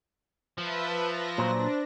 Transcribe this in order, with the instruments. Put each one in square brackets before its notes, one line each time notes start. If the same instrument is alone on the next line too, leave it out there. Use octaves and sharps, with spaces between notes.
[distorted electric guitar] F3 [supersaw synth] B4 E5 A5
[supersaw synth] A#6
[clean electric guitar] A#2 F#3 [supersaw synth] D4 [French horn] C5